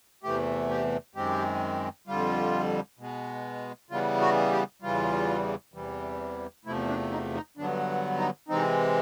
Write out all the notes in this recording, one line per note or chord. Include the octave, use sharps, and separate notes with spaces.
E2 C3 E3 A3 G4
G4
F#2 D#3 G#3 C4 G4
F2 D3 G3 F4
B2 G#3 B3
C#3 E3 G3 B3 F4
F#4
G4
E2 C#3 E3 G3 F4
E2 C3 E3 G3
E2 C3 F3 A3 E4
D4
D#4
D#4
G2 D3 F#3 B3 D4
D#4
C3 E3 G#3 C4 D#4